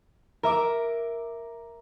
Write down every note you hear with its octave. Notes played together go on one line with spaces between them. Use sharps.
A#4 E5 D6